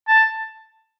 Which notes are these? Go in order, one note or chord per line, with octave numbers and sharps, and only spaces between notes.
A5